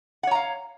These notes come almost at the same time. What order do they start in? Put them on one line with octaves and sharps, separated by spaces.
F#5 C#5 A#5 F5